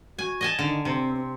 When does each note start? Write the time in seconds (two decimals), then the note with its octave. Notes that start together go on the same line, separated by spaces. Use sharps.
0.18 F#4 G#5
0.41 D#5 G#5 A5
0.59 D3 D#3
0.85 C3 C4
1.17 C4